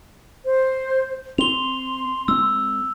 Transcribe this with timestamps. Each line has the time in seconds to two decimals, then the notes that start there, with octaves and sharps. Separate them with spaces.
0.44 C5
1.38 C4 C6 F7 G7
2.28 G#3 C4 E6